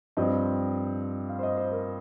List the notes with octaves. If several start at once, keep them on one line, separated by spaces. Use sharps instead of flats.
G2 F3 C4 D#5
F5
C5
D#5
C5
A#4